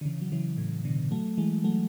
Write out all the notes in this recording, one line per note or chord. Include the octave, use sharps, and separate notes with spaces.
D3
C#3 E3
F#3
C#3 E3
A2 C#3
B2 D3
F#3 A3
E3 G#3
F#3 A3